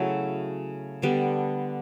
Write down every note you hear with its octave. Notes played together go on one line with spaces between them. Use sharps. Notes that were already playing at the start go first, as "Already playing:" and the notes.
Already playing: C#3 F#3 A3 E4
D3 G3 B3